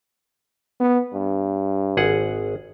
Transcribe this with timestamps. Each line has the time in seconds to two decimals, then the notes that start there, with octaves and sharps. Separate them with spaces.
0.80 B3
1.14 G2
1.97 G#1 G#4 F#5